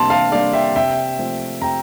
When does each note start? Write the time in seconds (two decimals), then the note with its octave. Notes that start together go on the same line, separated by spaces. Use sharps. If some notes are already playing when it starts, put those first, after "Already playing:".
Already playing: C3 G3 A#3 D4 A5 C6
0.10 F5 A5
0.32 G3 A#3 D4 D5 F5
0.53 E5 G5
0.76 C3 E5 G5
1.19 F3 A3 C4
1.62 C3 G5 A#5